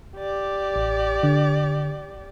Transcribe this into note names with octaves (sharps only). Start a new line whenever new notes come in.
G4 D5
A1
D3